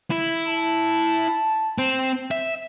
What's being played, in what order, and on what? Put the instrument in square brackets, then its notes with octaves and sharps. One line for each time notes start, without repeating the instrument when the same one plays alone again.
[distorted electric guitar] E4
[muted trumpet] A5
[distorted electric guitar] C4
E5